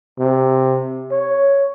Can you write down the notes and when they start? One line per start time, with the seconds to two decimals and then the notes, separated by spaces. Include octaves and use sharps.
0.19 C3
1.12 C#5